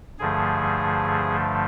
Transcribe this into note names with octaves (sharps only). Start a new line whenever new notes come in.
G2 D3 F3 A3 G#4